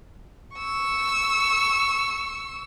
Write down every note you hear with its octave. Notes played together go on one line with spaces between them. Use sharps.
C#6 E6